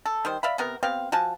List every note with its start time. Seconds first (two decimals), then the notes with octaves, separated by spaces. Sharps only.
0.06 A4
0.25 D#3 G3 C5
0.43 D5 E5 F5 B5
0.58 C3 B3 A#4
0.83 B3 C4 G4 F5
1.12 F3 F#4 G#5 A5